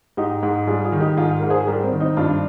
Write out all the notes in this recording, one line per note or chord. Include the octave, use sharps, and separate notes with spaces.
G#2 D#4 G4
G#2
G3 F4 G#4
F4 G#4
D#3
D#4 G4
G#2 F4 G#4
G#2 A#4
G#4 C5
G3 G4 A#4
C4
D#3
C4 D#4
G2 D4 F4